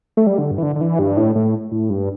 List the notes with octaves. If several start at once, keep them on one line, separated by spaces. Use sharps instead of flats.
A3
G3
D3
G2
E3
D3
D3
E3
G2
A2
A2
A2
G2